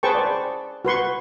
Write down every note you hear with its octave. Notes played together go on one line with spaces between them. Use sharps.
G#4 B4 C5 G5 A5 C#6
D5
F#4 B4 C6 C#6